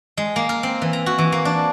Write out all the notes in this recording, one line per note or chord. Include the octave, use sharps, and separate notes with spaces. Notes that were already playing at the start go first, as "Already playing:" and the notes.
G#3
A#3
A#4
C4
E3
A#5
F#4
E3
A#3
D4